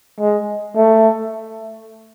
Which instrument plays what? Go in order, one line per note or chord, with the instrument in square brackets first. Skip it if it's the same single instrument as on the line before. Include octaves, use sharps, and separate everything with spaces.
[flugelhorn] G#3
A3